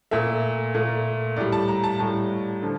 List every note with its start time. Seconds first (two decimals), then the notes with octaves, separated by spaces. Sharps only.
0.11 A#2 A3 E5
0.75 A#2 A3
1.36 A2 G3 D5
1.52 A5
1.68 A#5
1.84 A5
1.99 A2 G3 A5
2.62 D3 F3